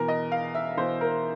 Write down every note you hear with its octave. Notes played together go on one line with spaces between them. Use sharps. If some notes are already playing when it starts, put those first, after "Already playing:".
Already playing: E2 B2 A#4
D#5
F5
E5
E2 B2 C5
A#4